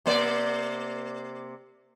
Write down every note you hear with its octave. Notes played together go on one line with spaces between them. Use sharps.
C3 A#3 D5